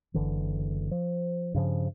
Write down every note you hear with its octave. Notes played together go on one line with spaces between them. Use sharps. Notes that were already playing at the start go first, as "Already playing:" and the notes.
F#1 D3 E3
F3
G2 C#3 F3